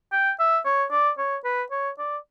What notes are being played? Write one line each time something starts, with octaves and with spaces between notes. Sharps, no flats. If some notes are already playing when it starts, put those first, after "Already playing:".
G5
E5
C#5
D5
C#5
B4
C#5
D5